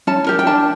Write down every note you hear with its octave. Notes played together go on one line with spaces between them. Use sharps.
C#4 A5
G4 A#4
G5
D4 A5